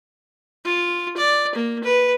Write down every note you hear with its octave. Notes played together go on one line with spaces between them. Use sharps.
F4
D5
A#3
B4